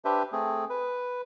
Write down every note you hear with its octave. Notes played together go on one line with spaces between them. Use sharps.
D4 G4 B4 C5 E5
A3 C4 G#4
B4